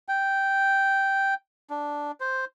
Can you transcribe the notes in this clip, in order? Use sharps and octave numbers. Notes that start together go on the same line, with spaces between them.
G5
D4
C5